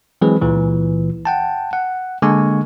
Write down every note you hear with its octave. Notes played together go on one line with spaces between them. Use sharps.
E3 F#3 G#3 C4 G#4 B4
C#2 A#2 E3
F#5 G5 A5
F#5
D3 G#3 A#3 G#5 C#6